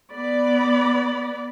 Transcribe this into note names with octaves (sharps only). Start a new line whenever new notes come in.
B3 D5 B5